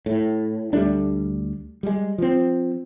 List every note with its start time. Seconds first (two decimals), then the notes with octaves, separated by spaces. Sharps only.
0.06 A2
0.73 D2 G3 A3 D4
1.83 G3 G#3
2.18 F3 C4